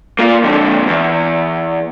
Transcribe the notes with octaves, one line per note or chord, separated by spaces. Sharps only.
A#3 F4
F2 D3
E2